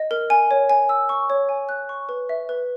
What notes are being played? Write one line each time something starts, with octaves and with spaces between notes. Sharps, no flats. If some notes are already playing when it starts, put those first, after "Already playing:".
Already playing: D#5
A#4
G#5
C#5
G#5
E6
C#6
C#5
G#5
F#6
C#6
B4
E5
B4